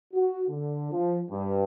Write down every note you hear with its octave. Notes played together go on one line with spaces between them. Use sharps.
F#4
D3
F3
G2